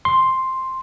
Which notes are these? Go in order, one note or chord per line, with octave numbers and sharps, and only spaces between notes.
C6